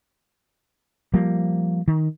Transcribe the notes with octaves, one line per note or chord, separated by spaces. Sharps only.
F3 G3 A#3
D#3